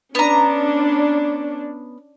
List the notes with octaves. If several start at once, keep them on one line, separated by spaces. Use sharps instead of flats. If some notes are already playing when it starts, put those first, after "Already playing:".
B3 C#4 D4 A#5